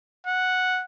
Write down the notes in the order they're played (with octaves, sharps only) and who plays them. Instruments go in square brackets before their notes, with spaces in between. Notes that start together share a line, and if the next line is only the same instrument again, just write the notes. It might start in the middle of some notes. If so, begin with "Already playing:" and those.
[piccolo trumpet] F#5